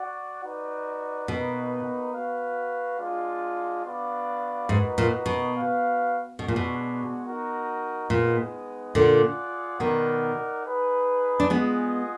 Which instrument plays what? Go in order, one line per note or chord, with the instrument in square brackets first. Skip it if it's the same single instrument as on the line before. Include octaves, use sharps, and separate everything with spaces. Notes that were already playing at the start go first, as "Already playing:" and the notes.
Already playing: [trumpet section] F#4 D5 F#5
D#4 F#4 B4 D5
[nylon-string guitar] B2 [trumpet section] A#3 D#4 F#4 B4
[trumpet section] F#4 B4 F5
G#3 D4 F4
B3 D4 F#4 D5 F5
[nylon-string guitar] G#2 [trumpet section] A#3 D#4 F#4 B4
[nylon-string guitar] A#2
B2
[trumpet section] F#4 B4 F5
[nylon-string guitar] B2 [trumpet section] G#3 D4 F#4
[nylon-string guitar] A#2
B2
[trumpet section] D#4 F#4 A#4
[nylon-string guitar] A#2 [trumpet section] G#3 B3 D#4
[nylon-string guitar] A#2 D3 [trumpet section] F4 G#4 D5 F#5
[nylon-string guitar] B2 D#3 [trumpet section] D#4 A#4 D5 F#5
[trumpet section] D#4 G#4 B4
[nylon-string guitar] D4
[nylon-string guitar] G#3 B3 [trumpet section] F4 G#4 D#5 F#5